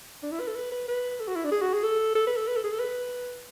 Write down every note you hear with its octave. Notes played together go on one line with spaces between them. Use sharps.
D4
E4
B4
A4
B4
B4
B4
A4
F#4
E4
D4
G#4
F#4
G#4
A4
A4
B4
A4
B4
A4
G#4
A4
B4